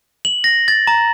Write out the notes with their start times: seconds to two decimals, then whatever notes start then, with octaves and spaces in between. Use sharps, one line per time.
0.25 F#7
0.44 A#6
0.68 A6
0.87 A#5